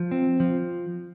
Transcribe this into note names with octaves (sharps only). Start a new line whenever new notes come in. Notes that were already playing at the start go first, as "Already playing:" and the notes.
Already playing: F3
C4
F3